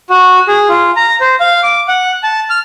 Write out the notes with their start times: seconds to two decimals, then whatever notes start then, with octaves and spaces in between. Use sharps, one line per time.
0.10 F#4
0.48 G#4
0.69 F4
0.97 A#5
1.21 C5
1.40 F5
1.63 D6
1.88 F#5
2.23 A5
2.50 F6